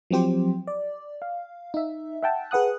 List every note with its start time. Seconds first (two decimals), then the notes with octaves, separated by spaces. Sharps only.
0.10 F3 F#3 C4 G4 C5
0.68 D5
1.22 F5
1.74 D#4 E5
2.23 E5 F#5 G5 A5
2.51 G#4 B4 F#5 D#6 F#6